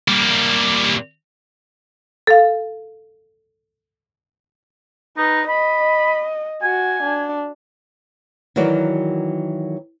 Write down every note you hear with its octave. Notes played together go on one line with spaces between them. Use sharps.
G3 A#3
A4 F5
D#4 B4
D#5 B5
F#4 G#5
D4
D#3 E3 F#3 F#4 A#4 D5